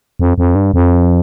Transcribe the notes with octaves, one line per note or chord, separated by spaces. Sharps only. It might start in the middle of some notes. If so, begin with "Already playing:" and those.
F2
F2
G2
F2